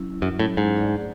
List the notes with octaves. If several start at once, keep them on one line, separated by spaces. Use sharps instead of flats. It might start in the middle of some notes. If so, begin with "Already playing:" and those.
Already playing: F#3 C#4 E4
F#2 F#3 C#4 E4
A2
G#2
A3 D4 G#4 D5 F#5